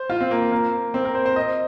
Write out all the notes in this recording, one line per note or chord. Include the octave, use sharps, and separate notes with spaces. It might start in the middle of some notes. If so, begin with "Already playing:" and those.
Already playing: C5
F4
C4
A#3
A#3
C4
A#4
C5
C5
D#5